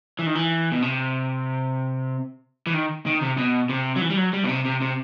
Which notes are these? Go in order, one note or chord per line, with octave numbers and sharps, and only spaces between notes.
E3
D#3
E3
B2
C3
E3
D#3
D#3
C3
B2
C3
F#3
E3
G3
F#3
G3
B2
C3
C3
C3